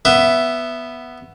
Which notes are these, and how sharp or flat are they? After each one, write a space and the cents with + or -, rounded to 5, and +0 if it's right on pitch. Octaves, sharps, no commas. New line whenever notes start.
B3 +0 E5 +10